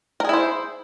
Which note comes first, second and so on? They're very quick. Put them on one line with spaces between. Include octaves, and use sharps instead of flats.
A#4 G#4 E4 C5